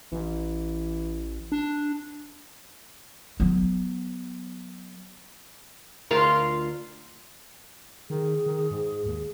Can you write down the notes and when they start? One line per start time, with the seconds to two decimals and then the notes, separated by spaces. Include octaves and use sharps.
0.12 A1 E3
1.52 D4
3.40 F#3 B3
6.11 D2 F4 A#4
8.10 D#3 G#4
8.46 D#3
8.71 G#2
9.06 D#2